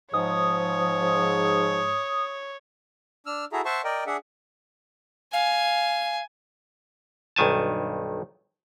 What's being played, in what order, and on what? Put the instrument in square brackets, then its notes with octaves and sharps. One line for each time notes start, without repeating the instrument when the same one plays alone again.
[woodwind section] G#2 [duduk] F3 [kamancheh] C#5 [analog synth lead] D#6
[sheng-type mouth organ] D4 E6 F6
E4 F#4 G#4 A4 E5 A#5
C5 E5 F#5 A5 C6 C#6
A#4 D5 D#5 G5
D4 G#4 E5 F#5
[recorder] F5 [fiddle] G#5
[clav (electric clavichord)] B1 G2 D#3 G#5 A5